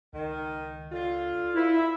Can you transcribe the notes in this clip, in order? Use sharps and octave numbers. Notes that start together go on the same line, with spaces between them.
C#2 D#3
D3 F4
E4
E5